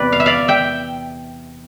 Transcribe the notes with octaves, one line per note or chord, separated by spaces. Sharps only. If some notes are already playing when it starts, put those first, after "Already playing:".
Already playing: E2 C3 C4 B4 D5
F5
E5
D5 F5
E5 G5